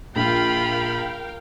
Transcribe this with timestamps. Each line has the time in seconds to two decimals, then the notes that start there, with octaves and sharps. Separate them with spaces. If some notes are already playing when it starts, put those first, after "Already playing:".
0.16 A#1 F4 A#4 F5 G5 B5